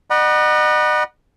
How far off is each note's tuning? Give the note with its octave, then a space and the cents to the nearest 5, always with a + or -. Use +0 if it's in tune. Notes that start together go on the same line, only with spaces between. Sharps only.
D#5 -40 F#5 +5 B5 -40